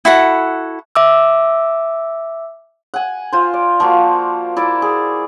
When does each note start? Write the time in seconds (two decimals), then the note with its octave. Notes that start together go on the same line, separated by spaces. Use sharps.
0.05 E4 F#4 A4 F#5
0.95 E5 D6 E6
2.94 F#5 G#5
3.32 F4 C5
3.54 D5
3.80 F3 A#3 F#4
4.57 E4 D5
4.82 G#4